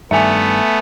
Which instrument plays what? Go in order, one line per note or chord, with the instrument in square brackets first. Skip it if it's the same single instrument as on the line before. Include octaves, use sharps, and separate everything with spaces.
[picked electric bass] G2 D#3 [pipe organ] A3 B3 [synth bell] E5 G#5